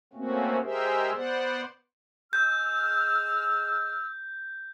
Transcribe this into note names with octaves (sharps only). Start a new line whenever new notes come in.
A3 A#3 C4 C#4 F#4
G#3 G4 G#4 A#4 C5 E5
B3 C5 D5 F#5
G#3 E6 F6 G6